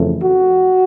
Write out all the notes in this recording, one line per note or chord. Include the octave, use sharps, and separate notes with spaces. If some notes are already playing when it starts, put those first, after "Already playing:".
Already playing: F2 C#3 E3 A3
F#4